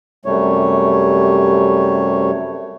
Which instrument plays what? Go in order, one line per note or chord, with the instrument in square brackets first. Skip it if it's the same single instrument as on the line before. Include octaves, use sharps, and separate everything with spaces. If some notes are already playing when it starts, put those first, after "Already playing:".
[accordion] F#2 C3 G3 A3 C#5